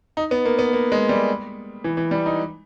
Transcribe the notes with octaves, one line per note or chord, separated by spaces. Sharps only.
D#4
B3
A#3
B3
A#3
G#3
G3
E3
E3
G3
D#4